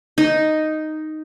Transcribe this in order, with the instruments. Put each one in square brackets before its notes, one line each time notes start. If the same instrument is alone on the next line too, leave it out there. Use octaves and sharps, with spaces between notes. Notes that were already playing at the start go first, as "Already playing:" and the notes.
[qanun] D#4